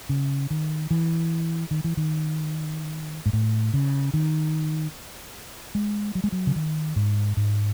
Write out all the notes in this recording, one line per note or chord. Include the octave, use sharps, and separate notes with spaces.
C#3
D#3
E3
D#3
E3
D#3
G#2
A2
C#3
D#3
G#3
F#3
G#3
F#3
C#3
D#3
G#2
G#2